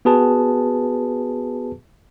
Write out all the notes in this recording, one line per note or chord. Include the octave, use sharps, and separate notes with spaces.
B3 F#4 G#4 B4 A5